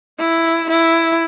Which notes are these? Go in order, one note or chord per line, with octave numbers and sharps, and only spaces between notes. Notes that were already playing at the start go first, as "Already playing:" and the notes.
E4
E4